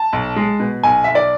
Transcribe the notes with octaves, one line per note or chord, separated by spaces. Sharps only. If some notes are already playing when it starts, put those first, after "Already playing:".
Already playing: A5
B1
G#3
B2
B1 G#5
B1 E5
D5